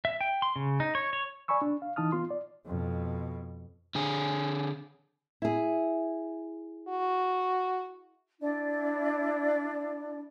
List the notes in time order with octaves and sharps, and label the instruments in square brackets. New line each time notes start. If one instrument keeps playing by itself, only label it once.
[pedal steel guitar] E5
G5
C6
C#3
D#4
C#5
C#5
[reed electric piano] D5 G#5 B5 C#6 E6
D4
F5
E3 D#4 A5 D#6 F6
B3 F4 C6
D5
[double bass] F2 B2
[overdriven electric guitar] D3 G#4
[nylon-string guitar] E4 G#4
[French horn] F#4
[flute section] D4 E4 D5